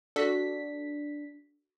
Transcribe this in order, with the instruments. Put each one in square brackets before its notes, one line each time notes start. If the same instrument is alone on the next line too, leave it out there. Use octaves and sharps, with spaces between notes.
[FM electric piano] D4 B6 [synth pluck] F#4 A4